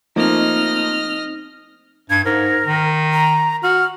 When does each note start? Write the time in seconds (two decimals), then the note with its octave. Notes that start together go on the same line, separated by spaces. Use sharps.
0.16 F3 A3 A#3 C4 D#4 D#5 F6
2.10 G2 G#6
2.25 G#2 A#4
2.66 D#3
3.13 A#5
3.63 F#4 F6